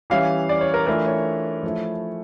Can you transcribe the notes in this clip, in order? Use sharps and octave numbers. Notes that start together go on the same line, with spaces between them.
E3 G3 C#4 E4 F5
D5
C#5
A#4
E3 A3 D4 F4 A#4
C#5
F3 A3 E4